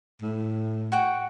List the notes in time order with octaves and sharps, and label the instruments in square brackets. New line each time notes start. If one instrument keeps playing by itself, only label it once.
[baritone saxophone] A2
[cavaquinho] F#4 F#5 G5